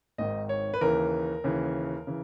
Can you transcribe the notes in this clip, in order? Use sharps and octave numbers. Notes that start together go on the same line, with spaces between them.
G#1 G#2 D#3 D#5
C#5
B4
D#2 C#3 E3 A#4
D#2 C#3 E3
C#3 E3